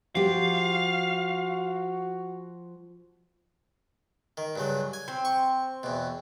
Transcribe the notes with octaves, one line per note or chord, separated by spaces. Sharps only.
F3 F#4 G4 F5
D#3
G2 C#3 F#3
G#5
C4
C#6
E2 B2